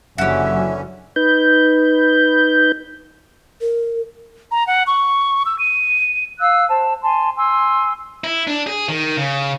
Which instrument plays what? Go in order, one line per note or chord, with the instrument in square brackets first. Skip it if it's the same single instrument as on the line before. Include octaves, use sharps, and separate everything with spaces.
[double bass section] F#1 F#3 [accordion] D3 E3 C#4 [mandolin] F#4 G4 [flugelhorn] E5
[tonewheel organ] D#4 B4 G6
[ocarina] A#4
[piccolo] A#5
F#5
C#6
E6
D#7
[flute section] F5 E6 F#6
C5 A5
G#5 A5 C6
G#5 C6 E6
[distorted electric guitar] E4
D4
G#4
D#3
C#3